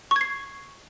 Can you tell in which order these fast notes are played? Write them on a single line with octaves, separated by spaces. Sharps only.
C#6 G#6 C7